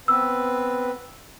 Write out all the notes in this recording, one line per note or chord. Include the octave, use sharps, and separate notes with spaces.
B3 C4 B4 E6